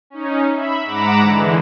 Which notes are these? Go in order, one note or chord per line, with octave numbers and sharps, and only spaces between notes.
C#4 D#4
E5 B5
G#2 F#5 A#5 B5 D6 E7
D3 E3 G#3